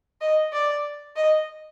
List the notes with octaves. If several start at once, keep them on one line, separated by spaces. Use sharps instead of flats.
D#5
D5
D#5